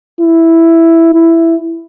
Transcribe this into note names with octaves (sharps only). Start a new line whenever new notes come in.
E4
E4